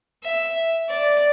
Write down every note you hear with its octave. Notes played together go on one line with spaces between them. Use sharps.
E5
D5